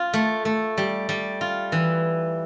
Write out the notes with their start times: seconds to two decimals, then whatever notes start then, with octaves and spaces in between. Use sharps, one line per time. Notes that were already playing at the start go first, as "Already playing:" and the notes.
Already playing: F4
0.14 A3
0.45 A3
0.78 G3
1.09 G3
1.41 F4
1.72 E3